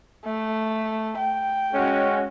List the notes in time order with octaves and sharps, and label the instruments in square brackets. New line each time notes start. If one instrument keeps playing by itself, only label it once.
[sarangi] A3
G5
[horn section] G#3 C#4 F#4